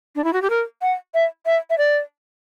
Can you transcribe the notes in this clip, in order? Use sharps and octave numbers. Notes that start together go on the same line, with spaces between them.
D4
E4
F#4
G4
A#4
F#5
E5
E5
E5
D5